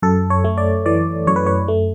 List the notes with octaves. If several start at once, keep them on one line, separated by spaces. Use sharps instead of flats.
F#2 A4
C#5
A3
D5
E3 D5
F#2 C#5
B4
C#5
A3